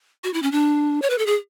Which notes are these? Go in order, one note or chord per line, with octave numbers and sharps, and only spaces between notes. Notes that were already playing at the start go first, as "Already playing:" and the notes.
F#4
E4
C#4
D4
C#5
B4
A4
G#4